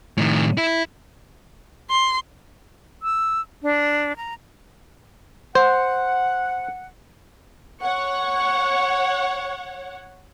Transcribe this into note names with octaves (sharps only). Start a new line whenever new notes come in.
A2 D#3
E4
C6
E6
D4
A#5
C5 F#5
C#5 F#5 C#6